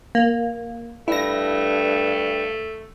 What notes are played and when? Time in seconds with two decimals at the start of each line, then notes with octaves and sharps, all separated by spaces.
0.15 A#3
1.08 G2 A3 E4 A#6